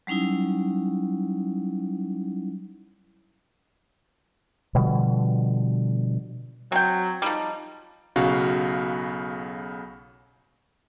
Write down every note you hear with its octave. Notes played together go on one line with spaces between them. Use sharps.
F#3 G3 C#4 D#4 E4
B2 D3 F3 G3
F#3 C4 G5
F3 G3 D#4
B1 C#3 F#4 F5